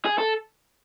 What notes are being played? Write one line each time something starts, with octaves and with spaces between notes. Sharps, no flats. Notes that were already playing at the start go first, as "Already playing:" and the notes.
G#4
A4